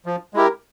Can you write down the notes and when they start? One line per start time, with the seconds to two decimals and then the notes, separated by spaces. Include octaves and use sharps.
0.06 F3
0.34 G#3 E4 G4 A#4